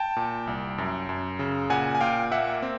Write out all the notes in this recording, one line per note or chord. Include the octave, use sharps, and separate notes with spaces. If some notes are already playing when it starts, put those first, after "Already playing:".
Already playing: G5 A5
A#2
C2
F#2
F#2
C#3
A#2 F#5 G#5
G#5
A#2 F5 G5
A#3 E5 F#5
C4